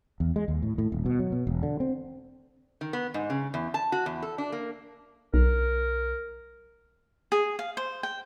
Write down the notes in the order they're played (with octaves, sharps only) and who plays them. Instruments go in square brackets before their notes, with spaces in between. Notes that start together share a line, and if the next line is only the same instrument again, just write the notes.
[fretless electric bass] E2
G#3
D#2
A2
A2
D#1
B2
F#3
B2
E1
D3
C4
[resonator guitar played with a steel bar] D#3
B3
G#2
C#3
E2
A5
F#4
E2
A4
D4
A#3
[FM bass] B1 [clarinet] A#4
[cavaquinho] G#4
F5
C5
G5